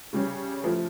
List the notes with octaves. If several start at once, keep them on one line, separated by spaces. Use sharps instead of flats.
C#3 G3 C#4
F3 A3 E4